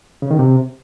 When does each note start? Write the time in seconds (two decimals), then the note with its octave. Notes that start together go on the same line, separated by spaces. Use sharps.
0.22 C#3
0.31 D#3
0.39 C3